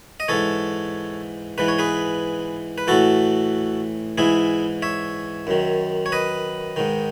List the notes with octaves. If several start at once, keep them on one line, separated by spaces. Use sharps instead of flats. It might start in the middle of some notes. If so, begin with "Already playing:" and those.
D#5
G#2 E3 A4 C#5
G#2 E3 B4
C#5
G#4 B4
B4
A2 E3 F#4 A4
G#2 E3 E4 G#4
C#5 E5
F#2 D#3
C#5
B4 D#5
G#2 D#3